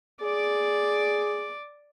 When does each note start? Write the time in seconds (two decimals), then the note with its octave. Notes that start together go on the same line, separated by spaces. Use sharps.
0.23 G#4 D5 D6